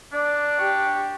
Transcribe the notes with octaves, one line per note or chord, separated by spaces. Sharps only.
D4 D5
G4 C#6